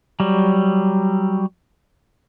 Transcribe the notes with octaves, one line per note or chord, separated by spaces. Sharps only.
F#3 G3